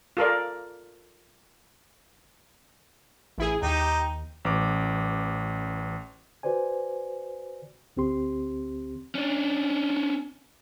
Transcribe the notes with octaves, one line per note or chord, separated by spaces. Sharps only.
F4 A4 A#4 D5
A1 E4 G#4
D#2 D#4 G4
A1 D6
F#4 B4 C5 D5 G#5
D2 C4 G4 C6
C#4 D4